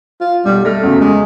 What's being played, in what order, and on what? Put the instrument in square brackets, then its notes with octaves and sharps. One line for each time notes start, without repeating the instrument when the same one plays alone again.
[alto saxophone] F4
[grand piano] B1 [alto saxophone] G3
[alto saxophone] A3 [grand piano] F6 A#6
[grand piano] E2 C#3 F#3
[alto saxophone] G#3